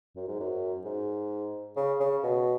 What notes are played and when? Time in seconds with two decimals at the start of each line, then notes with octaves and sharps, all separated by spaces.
0.16 F#2
0.28 G#2
0.40 F#2
0.85 G#2
1.77 C#3
2.00 C#3
2.23 B2